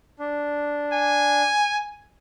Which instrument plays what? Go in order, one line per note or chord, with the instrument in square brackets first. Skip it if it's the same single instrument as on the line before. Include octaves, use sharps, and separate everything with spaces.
[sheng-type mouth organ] D4
[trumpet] G#5